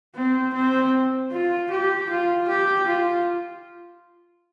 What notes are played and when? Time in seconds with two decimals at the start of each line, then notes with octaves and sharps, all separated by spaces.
0.15 C4
0.54 C4
1.32 F4
1.70 G4
2.09 F4
2.48 G4
2.87 F4